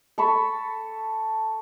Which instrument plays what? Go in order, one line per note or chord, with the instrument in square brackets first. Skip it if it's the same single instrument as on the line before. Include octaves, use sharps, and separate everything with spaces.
[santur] A4 A5 B5 C#6